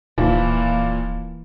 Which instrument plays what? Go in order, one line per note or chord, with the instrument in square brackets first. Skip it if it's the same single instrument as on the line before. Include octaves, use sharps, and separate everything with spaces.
[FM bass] D1 [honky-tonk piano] A#2 F3 [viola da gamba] E3 A#3